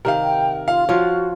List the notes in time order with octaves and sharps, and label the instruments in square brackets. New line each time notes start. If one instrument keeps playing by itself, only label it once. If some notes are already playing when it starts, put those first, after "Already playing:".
[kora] C3 D#3 [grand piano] A#4 F5
[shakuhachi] G5
[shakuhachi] F4 [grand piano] F5
[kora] F3 F4 C#5 [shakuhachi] F#4